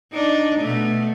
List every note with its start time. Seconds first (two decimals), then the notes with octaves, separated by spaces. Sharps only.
0.12 D4 D#4
0.60 B2 A3